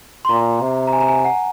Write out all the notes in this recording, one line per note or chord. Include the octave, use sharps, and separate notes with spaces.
C6
A#2 A#5
C3
A#5
G#5
A#5
G#5
F#5